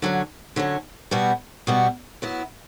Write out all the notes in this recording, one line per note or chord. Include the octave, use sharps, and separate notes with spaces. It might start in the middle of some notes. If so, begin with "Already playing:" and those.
D3 F#3 C#4
D3 F#3 C#4
B2 G3 B3 F#4
B2 G3 B3 F#4
F#3 B3 E4